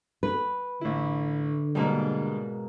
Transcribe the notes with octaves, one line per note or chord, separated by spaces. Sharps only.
B4
A1 D3 E4
G#2 B2 G3 G#3 A#3 D4